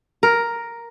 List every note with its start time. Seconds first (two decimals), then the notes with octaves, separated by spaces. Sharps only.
0.23 A#4